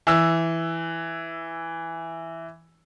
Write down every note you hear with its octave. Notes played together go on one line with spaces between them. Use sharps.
E3 E6